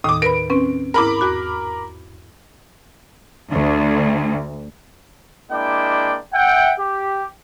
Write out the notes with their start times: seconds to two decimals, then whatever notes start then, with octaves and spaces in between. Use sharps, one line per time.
0.04 D#2 A2 D#3 D6 D#6
0.22 A#4 B4 B5 D7
0.50 C4 C#4 B4
0.94 G#2 E4 A#4 B5 D6
1.21 E2 F#4 F#6
3.52 D2
5.51 G#3 A#3 D4 E4 D5 G5
6.33 E5 F#5 G5
6.78 G4